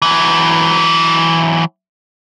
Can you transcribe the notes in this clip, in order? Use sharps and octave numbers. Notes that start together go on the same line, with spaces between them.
E3 F#3